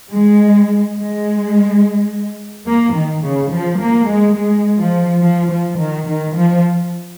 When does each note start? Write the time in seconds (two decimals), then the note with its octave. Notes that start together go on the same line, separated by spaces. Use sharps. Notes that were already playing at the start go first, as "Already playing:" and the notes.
0.11 G#3
0.97 G#3
2.67 A#3
2.94 D#3
3.23 C#3
3.52 F3
3.81 A#3
4.08 G#3
4.37 G#3
4.80 F3
5.23 F3
5.51 F3
5.79 D#3
6.07 D#3
6.36 F3